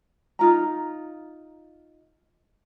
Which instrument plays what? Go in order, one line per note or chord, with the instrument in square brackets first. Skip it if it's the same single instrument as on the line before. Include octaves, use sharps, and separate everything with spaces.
[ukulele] D#4 F4 A#5